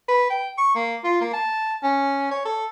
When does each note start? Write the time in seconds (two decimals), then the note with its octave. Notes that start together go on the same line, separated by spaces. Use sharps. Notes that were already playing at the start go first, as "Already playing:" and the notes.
0.08 B4
0.30 G5
0.58 C#6
0.75 A#3
1.04 F4
1.21 A#3
1.33 A5
1.83 C#4
2.31 C#5
2.45 A4